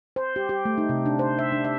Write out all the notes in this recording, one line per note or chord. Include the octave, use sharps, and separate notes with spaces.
C5
G4
G4
A3
D#4
C3
D4
C5
E5
D4
E5